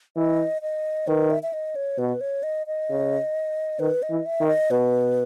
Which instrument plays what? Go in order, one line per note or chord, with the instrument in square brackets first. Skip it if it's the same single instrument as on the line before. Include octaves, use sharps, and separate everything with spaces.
[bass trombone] E3 [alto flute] D#5
[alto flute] D#5
[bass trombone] D#3 [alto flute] B4
[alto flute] E5
E5
D#5
C#5
[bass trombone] B2 [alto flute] B4
[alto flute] C#5
D#5
D#5
[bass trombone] C#3
[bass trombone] D#3 [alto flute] B4
[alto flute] D#5
[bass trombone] E3
[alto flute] E5
[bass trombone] D#3
[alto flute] D#5
[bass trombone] B2 [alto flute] B4